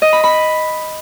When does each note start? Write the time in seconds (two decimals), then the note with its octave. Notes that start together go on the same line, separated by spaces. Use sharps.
0.02 D#5
0.13 B5
0.24 B5